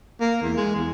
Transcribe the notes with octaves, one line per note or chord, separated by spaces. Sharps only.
A#3
E2
G#3
E2